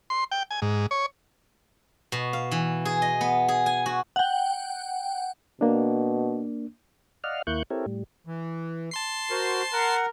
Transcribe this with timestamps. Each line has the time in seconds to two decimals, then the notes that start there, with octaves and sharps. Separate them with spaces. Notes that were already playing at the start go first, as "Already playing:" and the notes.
0.10 C6
0.32 G5
0.51 G#5
0.62 G#2
0.91 C#5
2.12 B2
2.33 F5
2.51 E3
2.85 G#4
3.02 D#5
3.21 B3
3.48 G#4
3.66 G#5
3.86 F#4
4.16 F#5 G5
5.61 B2 A#3 D4
7.24 D5 D#5 F5 F#5 F6
7.47 D#2 A#3 E4 C#6 F#6 G6
7.70 C4 E4 G4 A4 A#4 C#5
7.86 A2 G3
8.27 E3
8.91 A5 C6 C7
9.30 F#4 A#4 C5
9.72 A#4 F#5